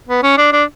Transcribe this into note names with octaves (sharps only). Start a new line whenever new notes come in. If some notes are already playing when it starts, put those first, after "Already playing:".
B3
C#4
D4
D4